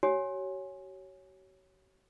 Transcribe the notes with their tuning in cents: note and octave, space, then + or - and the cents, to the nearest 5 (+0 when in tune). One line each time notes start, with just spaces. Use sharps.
F#4 +45 C#5 +0 G#5 +0